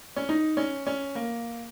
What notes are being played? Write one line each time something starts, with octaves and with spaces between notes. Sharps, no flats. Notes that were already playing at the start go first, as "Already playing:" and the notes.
C#4
D#4
C#4
C#4
A#3